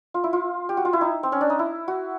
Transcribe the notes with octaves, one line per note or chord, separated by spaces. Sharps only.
F4
E4
F4
G4
F#4
F4
E4
D#4
C4
C#4
D4
D#4
E4
F#4